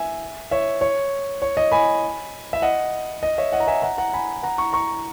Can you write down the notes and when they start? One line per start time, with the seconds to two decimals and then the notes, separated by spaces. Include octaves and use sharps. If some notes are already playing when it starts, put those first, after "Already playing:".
Already playing: E5 G#5
0.51 C#5 E5
0.81 C#5
1.42 C#5
1.57 D#5
1.72 G#5 B5
2.53 E5
2.62 D#5 F#5
3.23 D#5
3.38 C#5 E5
3.52 D#5 F#5
3.60 A#5
3.67 E5 G#5
3.82 F#5 A#5
3.98 F#5 A#5
4.13 G#5 B5
4.43 F#5 A#5
4.58 A#5 C#6
4.73 A#5 C#6